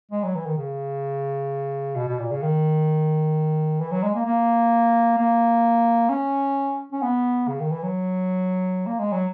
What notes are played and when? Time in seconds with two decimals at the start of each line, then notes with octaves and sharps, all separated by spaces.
0.12 G#3
0.24 F#3
0.35 E3
0.46 D#3
0.58 C#3
1.96 B2
2.08 B2
2.19 A#2
2.31 C#3
2.43 D#3
3.81 E3
3.91 F#3
4.03 G#3
4.15 A#3
4.26 A#3
5.18 A#3
6.10 C#4
6.93 C#4
7.03 B3
7.48 C#3
7.60 D#3
7.72 E3
7.83 F#3
8.86 A#3
8.99 G#3
9.12 F#3